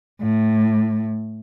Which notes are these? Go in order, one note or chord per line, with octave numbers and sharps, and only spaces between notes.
A2